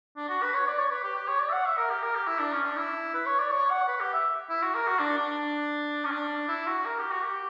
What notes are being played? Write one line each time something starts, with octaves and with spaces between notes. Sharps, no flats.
D4
F#4
B4
C#5
D5
C#5
B4
G4
G4
C#5
D5
E5
F#5
E5
A#4
G4
A#4
G4
E4
D4
C#4
D4
E4
B4
C#5
D5
C#5
F#5
B4
G4
E5
E4
F#4
A#4
F#4
D4
D4
C#4
D4
E4
F#4
A#4
G4
F#4
G4